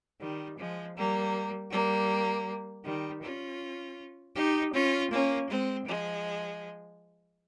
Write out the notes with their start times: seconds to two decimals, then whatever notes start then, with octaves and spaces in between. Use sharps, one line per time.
0.21 D#3 G3
0.59 F3 G#3
0.96 G3 A#3
1.72 G3 A#3
2.85 D#3 G3
3.22 C#4 F4
4.36 D#4 G4
4.74 C#4 F4
5.11 A#3 C#4
5.50 G#3 C4
5.87 F3 G#3